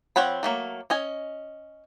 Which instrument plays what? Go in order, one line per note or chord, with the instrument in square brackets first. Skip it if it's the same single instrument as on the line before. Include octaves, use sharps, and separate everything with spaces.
[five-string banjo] F3 C4 C#5 F#5 B5
F#3 A3 A#3
C#4 D#5 G#5